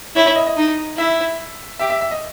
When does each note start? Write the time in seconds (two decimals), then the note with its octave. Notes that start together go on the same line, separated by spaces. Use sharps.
0.16 E4 C#5
0.26 C#5
0.36 D#5
0.47 D#5
0.57 D#4
0.97 E4 E5
1.79 G4 E5
1.90 E5
2.01 E5
2.11 D#5